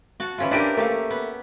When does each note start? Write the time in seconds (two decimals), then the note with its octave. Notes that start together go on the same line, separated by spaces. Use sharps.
0.20 F#4 A5
0.38 E3 C#4 F4
0.51 D4 E4 G4 A#4 D7 D#7
0.77 A3 A#3 G4 F5
1.10 B3